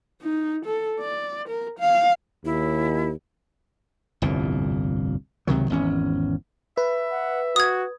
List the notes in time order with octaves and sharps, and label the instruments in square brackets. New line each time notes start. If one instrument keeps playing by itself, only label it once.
[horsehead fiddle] D#4
A4
D5
A#4
F5
[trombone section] D#2 [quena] E4
[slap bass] G1 C2 F2 A#2
C#2 C3 D#3 F#3
G#1 E2 C#4
[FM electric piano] B4 [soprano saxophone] E5
[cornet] F#5
[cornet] F#4 [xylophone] D#6 G#6